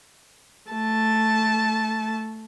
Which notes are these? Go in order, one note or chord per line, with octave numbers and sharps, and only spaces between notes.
A3 A5